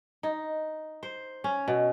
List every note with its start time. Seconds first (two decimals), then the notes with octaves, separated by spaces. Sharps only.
0.23 D#4
1.03 C5
1.44 C#4
1.68 B2